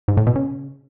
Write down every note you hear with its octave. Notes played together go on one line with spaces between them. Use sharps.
G#2
A2
B2
C#3